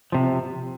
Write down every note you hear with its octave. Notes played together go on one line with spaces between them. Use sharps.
C3 F3